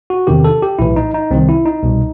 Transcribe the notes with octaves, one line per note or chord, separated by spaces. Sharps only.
F#4
E2 C3 D#3 G4
A4
G4
B1 A2 E3 E4
D#4
D#4
C2 C3 D#3 C4
E4
D#4
C2 B2